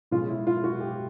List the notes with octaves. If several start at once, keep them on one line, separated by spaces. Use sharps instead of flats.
B2 G#3 C#4 F4
E4
F4
F#4
G4